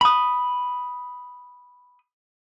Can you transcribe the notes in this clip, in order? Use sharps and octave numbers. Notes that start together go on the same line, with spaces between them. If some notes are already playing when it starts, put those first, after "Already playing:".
B5 D#6